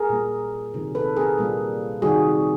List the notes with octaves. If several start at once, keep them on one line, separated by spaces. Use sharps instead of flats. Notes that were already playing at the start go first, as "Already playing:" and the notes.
Already playing: G#4 A#4
A#2 G3 A#3
C3 D#3 F#3
A4 B4
G#4 A#4
A#2 G3 A#3
C3 D#3 G3 F#4 G#4